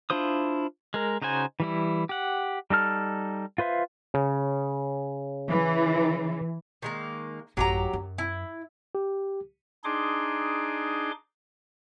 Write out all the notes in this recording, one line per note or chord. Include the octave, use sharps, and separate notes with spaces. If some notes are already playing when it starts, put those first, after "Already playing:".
D4 E4 F4 C5 D#6
G#3 A#4
C#3 D#4 F#4 C5 G#5
E3 G3 E4
G4 F#5
G3 D#4 A4 F6
F4 B4 C5 E5 F5
C#3
E3
D#3 G#3 A#3
A1 F#2 F#3 G4 A#5
F#2
E4
G4
D4 D#4 G#4 C6 D6